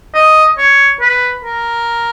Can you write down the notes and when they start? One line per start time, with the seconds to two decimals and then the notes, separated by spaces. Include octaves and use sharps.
0.15 D#5
0.58 C#5
1.01 B4
1.44 A#4